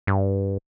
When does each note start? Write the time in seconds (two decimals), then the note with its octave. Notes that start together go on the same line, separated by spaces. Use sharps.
0.07 G2